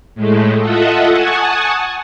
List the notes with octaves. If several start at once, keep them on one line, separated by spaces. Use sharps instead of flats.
A2 G#3 A3
F4 A4 D#5 E5 F#5
F#5 G#5 A5 C#6 D#6